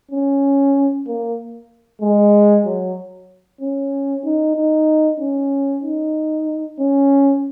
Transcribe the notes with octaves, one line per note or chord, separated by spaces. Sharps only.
C#4
A#3
G#3
F#3
C#4
D#4
D#4
C#4
D#4
C#4